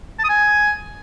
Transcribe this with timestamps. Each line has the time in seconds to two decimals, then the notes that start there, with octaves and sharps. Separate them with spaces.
0.19 A5
0.24 D#6
0.29 G#5